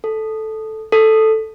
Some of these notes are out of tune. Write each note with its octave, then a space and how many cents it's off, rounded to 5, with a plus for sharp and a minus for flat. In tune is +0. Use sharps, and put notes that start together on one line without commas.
A4 -5
A4 +0